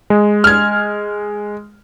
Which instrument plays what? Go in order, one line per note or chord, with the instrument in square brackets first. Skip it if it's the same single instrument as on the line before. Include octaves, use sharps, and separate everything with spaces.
[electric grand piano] G#3
[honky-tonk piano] F6 G#6